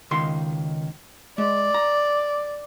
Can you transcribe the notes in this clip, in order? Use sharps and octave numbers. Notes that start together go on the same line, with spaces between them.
C#2 D#3 C6
G#3 D5
A#5